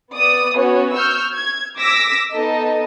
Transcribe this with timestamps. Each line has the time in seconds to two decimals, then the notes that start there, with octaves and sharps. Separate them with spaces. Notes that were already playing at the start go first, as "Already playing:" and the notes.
0.14 B3 D5 D#6
0.55 B3 C#4 F#4 C#5
0.93 C#6 E6 F6 G6
1.35 G#6
1.78 D6 E6 A#6 B6
2.32 B3 D#4 A4 D#5